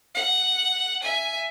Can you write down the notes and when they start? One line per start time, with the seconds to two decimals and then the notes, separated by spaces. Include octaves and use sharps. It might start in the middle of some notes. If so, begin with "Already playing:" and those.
0.15 F#5
1.02 E5 G#5